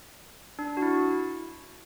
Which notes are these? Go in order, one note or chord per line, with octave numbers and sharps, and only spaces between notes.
D4
F#4
E4